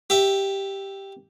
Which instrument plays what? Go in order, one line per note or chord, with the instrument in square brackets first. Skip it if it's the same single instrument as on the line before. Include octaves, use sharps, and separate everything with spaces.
[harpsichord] G4 E5